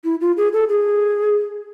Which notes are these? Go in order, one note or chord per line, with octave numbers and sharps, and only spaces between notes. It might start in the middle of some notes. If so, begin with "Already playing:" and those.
E4
F4
G#4
A4
G#4